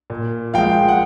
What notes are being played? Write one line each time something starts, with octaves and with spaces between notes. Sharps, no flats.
A#2
F3 G#3 F5 G5
F#5